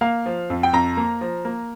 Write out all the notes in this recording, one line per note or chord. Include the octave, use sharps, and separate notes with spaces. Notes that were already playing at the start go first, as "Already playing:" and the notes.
A#3 F5
F3
F2
G5
F2 A#5
A#3
F3
A#3